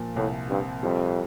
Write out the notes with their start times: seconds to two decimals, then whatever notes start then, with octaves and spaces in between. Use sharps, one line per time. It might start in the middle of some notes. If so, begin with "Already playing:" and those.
Already playing: A#2 F3
0.16 C2 A2
0.49 G2 C4
0.83 F2 G3